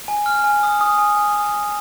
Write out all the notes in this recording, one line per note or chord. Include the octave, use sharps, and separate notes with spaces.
G#5
F6
G#5
D#6
D#6
G#5
G#5
D#6
D#6